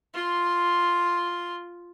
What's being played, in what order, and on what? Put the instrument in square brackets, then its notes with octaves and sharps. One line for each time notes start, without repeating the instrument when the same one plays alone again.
[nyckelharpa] F4 C6